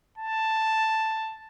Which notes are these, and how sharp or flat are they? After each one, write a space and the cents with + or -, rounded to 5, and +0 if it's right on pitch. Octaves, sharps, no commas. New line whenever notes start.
A5 +5